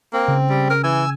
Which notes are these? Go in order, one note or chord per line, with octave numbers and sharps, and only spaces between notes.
A#3 C4
C#3
G3
A#4
E3 G#5 E6